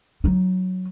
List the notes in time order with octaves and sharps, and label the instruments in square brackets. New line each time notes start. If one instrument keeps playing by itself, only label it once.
[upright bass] F#3 D#4